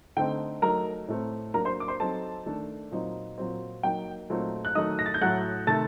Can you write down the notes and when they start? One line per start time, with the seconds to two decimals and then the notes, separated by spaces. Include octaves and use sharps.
0.17 D3 A3 C4 D#4 G5
0.62 F#3 A3 D#4 A#4 A#5
1.08 A2 A3 C4
1.54 F#3 A#3 D4 A#4 A#5
1.65 C5 C6
1.80 D6
1.88 C5 C6
2.00 F#3 C4 D#4 A4 A5
2.46 D#3 A3 D4
2.91 A#2 F#3 C4 D#4
3.38 A#2 F#3 C4
3.83 F#3 A#3 D#4 G5
4.30 A#2 F#3 A3 C4 D#4
4.65 F#6
4.75 D#3 F#3 A3 D#4 D#5 D#6
4.99 A#6
5.06 A6
5.14 G6
5.21 A2 F#3 A3 F#5 F#6
5.67 C3 D#3 A3 C4 A5 A6